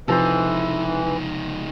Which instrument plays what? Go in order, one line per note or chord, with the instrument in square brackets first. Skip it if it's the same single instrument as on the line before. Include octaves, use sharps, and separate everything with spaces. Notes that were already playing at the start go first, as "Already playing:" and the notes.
[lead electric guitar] C#2 D#4 [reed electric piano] C3 F3 [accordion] E3 [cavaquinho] A4 C5